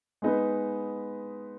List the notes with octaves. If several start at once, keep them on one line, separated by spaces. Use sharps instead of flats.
G#3 B3 D#4 B4